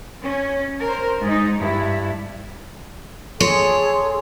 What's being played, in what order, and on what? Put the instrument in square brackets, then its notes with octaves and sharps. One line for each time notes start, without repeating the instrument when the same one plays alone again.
[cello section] C#4
A#4 C5
G#2 D#4
G2 E4
[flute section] G#4 A4 C6 [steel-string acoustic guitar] C#5